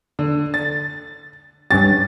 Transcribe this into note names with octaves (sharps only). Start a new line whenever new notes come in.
D3
A6
G2 C#4 G4 A6